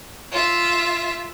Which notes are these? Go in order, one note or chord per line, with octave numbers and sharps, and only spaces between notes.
F4 E5